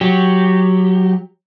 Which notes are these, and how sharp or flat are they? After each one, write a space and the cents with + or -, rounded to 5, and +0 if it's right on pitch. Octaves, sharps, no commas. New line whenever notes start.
F#3 +0 G4 +0